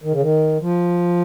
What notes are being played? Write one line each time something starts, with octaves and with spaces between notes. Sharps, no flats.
D#3
C#3
D#3
F3